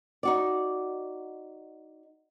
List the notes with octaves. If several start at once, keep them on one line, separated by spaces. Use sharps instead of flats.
D#4 F#4 D5